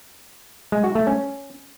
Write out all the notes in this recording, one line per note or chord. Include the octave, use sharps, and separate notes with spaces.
G#3
F#4
A3
C#4